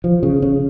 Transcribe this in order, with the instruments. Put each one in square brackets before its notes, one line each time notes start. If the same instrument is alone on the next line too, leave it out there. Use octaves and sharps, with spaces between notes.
[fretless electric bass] F3
C#3
C#3